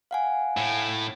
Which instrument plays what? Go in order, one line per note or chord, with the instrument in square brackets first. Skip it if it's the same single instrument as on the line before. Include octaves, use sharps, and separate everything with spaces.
[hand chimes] F5 F#5 G#5
[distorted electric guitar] A2